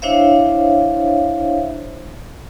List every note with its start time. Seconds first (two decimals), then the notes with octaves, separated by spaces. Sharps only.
0.02 D4 E4 C5 C#5 E5 F5